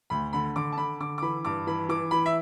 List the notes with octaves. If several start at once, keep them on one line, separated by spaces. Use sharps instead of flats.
D2 B5
D3 B5
D3 D6
A5
D3 B5
D3 D6
D6
E3 B5
G2 D6
E3 B5
E3 D6
E3 B5
E5